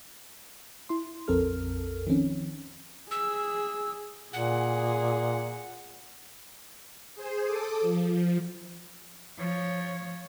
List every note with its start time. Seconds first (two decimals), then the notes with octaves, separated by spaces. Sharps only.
0.89 E4 C6
1.28 A#1 F2 C4 A4 A#4 F6
2.07 D#3 F3 C4 C#4
3.11 G#4 E6
4.33 A#2 G#4 F#5
7.15 G#4 C5
7.45 A4 D6 D#6
7.81 F3
9.38 F3 C#5